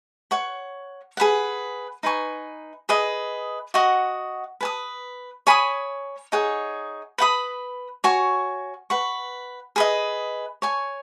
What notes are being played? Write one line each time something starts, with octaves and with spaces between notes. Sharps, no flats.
C#5 F#5 C#6
G#4 B4 F#5
D#4 B4 G#5 C#6
G#4 B4 D#5
F#4 D#5 F#5 C#6
B4 G#5 D#6
C#5 G#5 B5 D#6
D#4 G#4 C#5 F#5
B4 F#5 B5 D#6
F#4 C#5 G#5 C#6
B4 F#5 C#6
G#4 B4 D#5
C#5 G#5 C#6